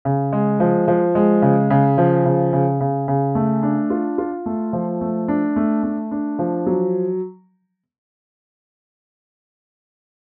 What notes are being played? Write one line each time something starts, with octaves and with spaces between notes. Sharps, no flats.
C#3
G#3
F3
F3
G#3
C#3
C#3
F3
C#3
C#3
C#3
C#3
A3
D4
F4
F4
A3
F3
A3
D4
A3
A3
D4
F3
F#3